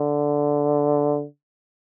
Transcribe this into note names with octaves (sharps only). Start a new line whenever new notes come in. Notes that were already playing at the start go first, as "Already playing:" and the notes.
Already playing: D3